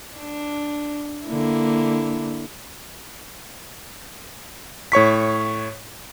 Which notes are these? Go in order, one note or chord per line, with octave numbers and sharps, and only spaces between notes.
D4
D3 A#3 E4
A2 C#5 C#6 B6